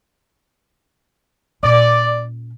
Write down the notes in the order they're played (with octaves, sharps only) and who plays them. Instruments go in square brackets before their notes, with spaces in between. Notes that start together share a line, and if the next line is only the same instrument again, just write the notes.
[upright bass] A#2 C#4 [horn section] D5